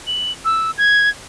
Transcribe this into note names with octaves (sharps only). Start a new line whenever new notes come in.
F#7
E6
G#6